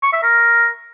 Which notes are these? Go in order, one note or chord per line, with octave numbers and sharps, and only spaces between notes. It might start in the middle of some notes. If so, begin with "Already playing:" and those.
C#6
E5
A#4